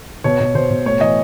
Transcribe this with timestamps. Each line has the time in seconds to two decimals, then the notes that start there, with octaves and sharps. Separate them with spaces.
0.24 B2 C#5
0.40 B2
0.55 B2 C5
0.70 B2
0.86 A2 C#5
1.01 E3 D#5